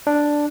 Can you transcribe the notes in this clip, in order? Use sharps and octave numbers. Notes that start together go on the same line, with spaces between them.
D4